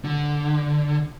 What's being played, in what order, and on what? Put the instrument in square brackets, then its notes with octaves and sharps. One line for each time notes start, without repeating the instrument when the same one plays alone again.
[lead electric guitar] D3